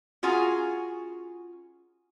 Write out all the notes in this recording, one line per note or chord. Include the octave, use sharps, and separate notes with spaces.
C#4 F4 F#4 G#4 G#5 A#5